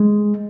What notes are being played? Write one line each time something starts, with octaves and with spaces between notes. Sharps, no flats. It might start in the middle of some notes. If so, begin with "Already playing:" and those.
Already playing: G#3